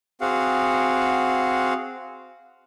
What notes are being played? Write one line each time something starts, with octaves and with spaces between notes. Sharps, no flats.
C4 F#4 G#4 F5 F#5